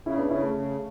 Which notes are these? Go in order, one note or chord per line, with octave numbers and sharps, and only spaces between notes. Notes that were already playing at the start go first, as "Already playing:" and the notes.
C#3 C#4 E4
B3 D4
C#3 C#4 E4
A3 C#4
C#3